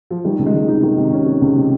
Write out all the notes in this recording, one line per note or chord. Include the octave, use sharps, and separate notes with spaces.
F3
D#3 G3
C#2
G#3
D#3
C3 D#4
D#3
C3
C3 C#4
D#3
C#2
C3